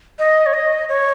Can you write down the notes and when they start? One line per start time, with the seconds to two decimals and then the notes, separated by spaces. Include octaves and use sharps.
0.19 D#5
0.46 C#5
0.54 D#5
0.88 C#5